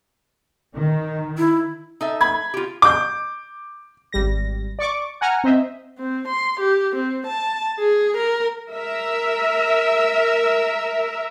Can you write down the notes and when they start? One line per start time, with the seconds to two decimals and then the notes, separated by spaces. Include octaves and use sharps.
0.76 D#3
1.38 E4
2.01 D#4 A4 E5
2.21 B5 G#6
2.54 F4 G4
2.82 D6 G6
4.13 G#1 G3 A#6
4.79 D5 C#6 D6
5.21 F#5 G#5 A#5 F6
5.44 C4 C5 D#5 E5
5.98 C4
6.28 C6
6.60 G4
6.96 C4
7.27 A5
7.79 G#4
8.17 A#4
8.71 A#4 E5